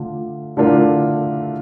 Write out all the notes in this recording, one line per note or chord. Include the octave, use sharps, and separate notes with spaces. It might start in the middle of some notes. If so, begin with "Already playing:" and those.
Already playing: D3 A3 D4 F4
D3 A3 D4 F4 A#4